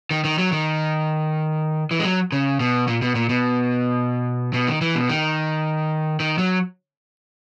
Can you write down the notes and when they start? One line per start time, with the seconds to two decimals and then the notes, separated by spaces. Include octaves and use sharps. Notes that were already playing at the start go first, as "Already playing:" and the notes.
0.11 D#3
0.24 D#3
0.39 F#3
0.52 D#3
1.91 E3
1.99 G#3
2.05 F#3
2.32 C#3
2.60 B2
2.88 A#2
3.02 B2
3.15 A#2
3.29 B2
4.54 B2
4.67 D#3
4.81 E3
4.95 B2
5.09 D#3
6.20 D#3
6.38 F#3